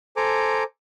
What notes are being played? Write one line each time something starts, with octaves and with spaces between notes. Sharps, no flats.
A4 C5 G#5 A#5 D6